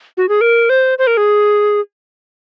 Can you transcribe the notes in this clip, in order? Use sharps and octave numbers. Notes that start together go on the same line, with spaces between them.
F#4
G#4
A#4
C5
C5
A#4
G#4